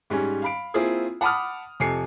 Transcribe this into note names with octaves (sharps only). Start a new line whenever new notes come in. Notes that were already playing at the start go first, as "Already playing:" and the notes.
G#2 G3 C#4 G#5
F5 B5 D7
A#3 C4 E4 F4 G#4
F#5 A5 B5 D6 D#6 F6
F2 C3 A4 G#5 C7 C#7